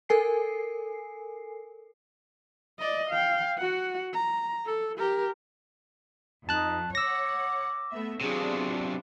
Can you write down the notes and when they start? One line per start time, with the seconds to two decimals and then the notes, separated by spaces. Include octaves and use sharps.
0.09 A4 A#4 G#5 C7
2.79 D5 D#5
3.10 F5 G5
3.58 F#4 F#5
4.14 A#5
4.66 A4
4.98 G4 A#4
6.49 F2 D#4 A5 F#6
6.95 C#5 F#5 D6 E6 A#6
7.91 A3 B3 E5
8.21 C3 F#3 B3 D4 F4 G#4